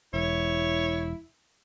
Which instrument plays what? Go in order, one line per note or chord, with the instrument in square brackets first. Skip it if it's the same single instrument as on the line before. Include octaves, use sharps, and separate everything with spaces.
[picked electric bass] E1 [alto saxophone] E4 [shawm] C#5